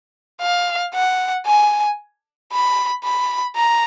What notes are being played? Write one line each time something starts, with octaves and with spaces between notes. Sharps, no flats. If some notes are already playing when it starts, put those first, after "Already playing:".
F5
F#5
G#5
B5
B5
A#5